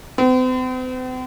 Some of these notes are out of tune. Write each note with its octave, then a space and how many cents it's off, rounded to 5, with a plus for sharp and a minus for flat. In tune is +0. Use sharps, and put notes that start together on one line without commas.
C4 -45